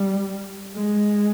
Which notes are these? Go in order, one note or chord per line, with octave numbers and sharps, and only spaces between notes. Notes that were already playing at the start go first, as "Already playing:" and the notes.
Already playing: G3
G#3